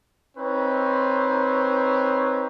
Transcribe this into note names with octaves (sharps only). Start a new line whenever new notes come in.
C4 D#4 B4 C#5